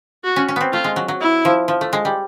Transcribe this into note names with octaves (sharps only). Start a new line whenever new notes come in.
F#4
C#4
C#4
B3 C4
A3 F4
G#3
F#3
F#3
E4
F3
F3
A3
G#3
G3